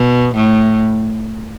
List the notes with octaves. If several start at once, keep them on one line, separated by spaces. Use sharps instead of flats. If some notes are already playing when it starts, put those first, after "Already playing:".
Already playing: B2
A2